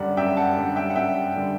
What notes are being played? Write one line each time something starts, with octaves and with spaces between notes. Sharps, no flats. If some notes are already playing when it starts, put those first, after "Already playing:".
Already playing: F#2 D3 G3 D5 F#5
F#2 E5 G5
F#5 A5
D3 G3
E5 G5
F#5
F#2 E5 G5
D3 G3